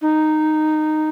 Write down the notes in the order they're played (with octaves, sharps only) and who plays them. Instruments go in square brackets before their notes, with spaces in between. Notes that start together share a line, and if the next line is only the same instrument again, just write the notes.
[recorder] D#4